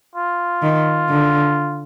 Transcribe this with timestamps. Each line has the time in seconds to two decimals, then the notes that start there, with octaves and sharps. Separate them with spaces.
0.15 F4
0.63 D#3
1.10 D3